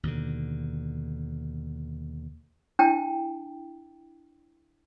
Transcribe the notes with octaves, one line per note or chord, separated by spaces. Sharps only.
D#2 B2 D3
D4 E4 G5 A5